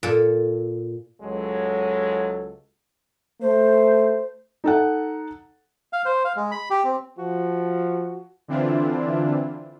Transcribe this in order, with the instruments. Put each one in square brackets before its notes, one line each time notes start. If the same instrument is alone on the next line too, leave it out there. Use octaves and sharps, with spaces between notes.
[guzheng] A#2 A4
[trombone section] C#2 F#3 G#3 A4
[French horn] A3 [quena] C5
[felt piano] D#4 A4 F#5
[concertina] F5
C5
F5
G#3
B5
G4
C4
[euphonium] F3 [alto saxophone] F#4
[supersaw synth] D3 E3 C4 D4 E4 F4